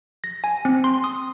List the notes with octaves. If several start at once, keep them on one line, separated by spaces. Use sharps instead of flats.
A#6
G#5
C4
C6
D#6